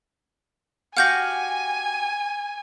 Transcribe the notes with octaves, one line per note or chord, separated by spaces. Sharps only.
F#4 G4 F5 F#5 G#5 G6 A#6